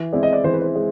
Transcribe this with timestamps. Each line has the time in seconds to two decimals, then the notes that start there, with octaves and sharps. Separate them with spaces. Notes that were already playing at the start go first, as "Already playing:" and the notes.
Already playing: E3
0.13 G#3 C4 E4 D5
0.23 D#5
0.33 D5
0.44 E3 C5
0.53 B4
0.62 C5
0.76 G#3